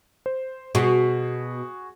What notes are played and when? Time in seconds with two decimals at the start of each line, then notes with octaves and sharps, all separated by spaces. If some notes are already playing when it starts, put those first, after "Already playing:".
0.26 C5
0.75 B2 F#4 G#4